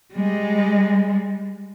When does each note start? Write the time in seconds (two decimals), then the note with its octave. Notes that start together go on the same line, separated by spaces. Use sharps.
0.13 G3 G#3